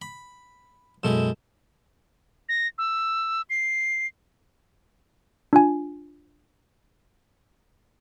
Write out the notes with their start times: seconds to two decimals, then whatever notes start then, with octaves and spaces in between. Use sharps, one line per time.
0.02 B5
1.03 F#2 B2 G#3 E4 A4 E7
2.49 A#6
2.78 E6
3.50 C7
5.53 D4 F4 G#5